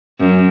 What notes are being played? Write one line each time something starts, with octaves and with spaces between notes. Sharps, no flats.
F#2